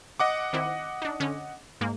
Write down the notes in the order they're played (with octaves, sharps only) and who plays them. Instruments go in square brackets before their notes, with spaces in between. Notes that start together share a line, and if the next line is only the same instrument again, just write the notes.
[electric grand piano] D#5 F#5 D6
[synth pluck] D#3 C4 E4
D4 D#4
D3 C#4
G#2 G#3 A#3